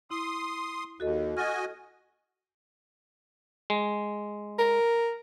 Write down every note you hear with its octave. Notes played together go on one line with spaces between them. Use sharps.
E4 C6 D#6
D#2 F#4 A4 D#5
F#4 D#5 G#5 F6 A6
G#3
A#4